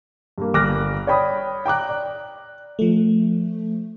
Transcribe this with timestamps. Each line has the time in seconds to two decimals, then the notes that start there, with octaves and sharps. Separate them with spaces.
0.38 G2 A#3
0.54 G1 D6 F6 F#6 A#6
1.07 C#5 D5 G5 B5 D#6
1.66 G5 A#5 D6 F#6
1.89 D5
2.79 F3 A3